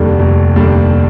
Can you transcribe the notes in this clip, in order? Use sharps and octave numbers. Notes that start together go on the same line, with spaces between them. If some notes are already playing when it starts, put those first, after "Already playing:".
Already playing: F1 D#2 D3 G3 D4
F1
D#2 D3 G3 D4